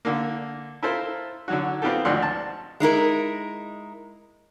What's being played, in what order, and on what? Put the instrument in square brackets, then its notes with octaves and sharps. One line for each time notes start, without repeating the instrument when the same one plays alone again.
[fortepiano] D3 A#3
E4 F4 A4 A#4 C5
D3 F#3 F#4
B3 C4 F4 G4 A4
G#1 D2 F3 D4 F#5 C6
A5
[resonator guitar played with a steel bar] G#3 D#4 E4 A#4